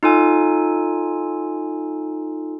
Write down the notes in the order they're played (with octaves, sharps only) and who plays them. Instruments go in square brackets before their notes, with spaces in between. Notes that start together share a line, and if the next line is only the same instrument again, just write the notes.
[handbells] D#4 F4 A4 G#5